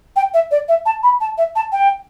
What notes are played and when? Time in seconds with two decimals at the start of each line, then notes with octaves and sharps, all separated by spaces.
0.16 G5
0.34 E5
0.51 D5
0.68 E5
0.86 A5
1.03 B5
1.21 A5
1.38 E5
1.55 A5
1.72 G5